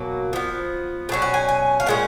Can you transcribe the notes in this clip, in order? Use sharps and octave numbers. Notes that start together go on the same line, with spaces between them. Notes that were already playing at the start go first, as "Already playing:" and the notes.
Already playing: B2 F#3 A#3 G#5
F3 B3
B2 F#3 C#4
F#5
G#5
G#5
F5
A#2 G#3 C#4 F#5